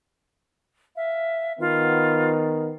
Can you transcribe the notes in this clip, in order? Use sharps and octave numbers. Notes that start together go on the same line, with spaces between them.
E5 F5
D#3 B3 F4